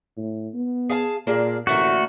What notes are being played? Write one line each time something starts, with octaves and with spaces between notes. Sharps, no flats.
A2
B3
G#4 F5 A5
A#2 A#3 D4 G#4
A1 D3 A3 A#3 F#4